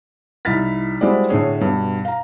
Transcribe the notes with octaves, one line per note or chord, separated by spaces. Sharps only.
C2 D#4 E4 F6 A6 B6
G3 G#3 C4 E4 F#4 D5
A2 D3 G#4 C#5
G2 B2
F5 A#5